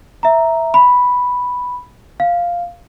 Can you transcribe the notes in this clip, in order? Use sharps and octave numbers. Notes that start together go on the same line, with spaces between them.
E5 A#5
B5
F5